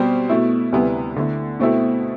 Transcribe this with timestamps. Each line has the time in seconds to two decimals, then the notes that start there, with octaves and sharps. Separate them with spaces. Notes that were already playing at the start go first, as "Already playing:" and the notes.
Already playing: B2 G3 C4 G4 C5
0.29 B2 A3 E4
0.73 D2 C3 G3 B3 E4
1.16 D3 A3 E4
1.60 B2 A3 C4 E4 A4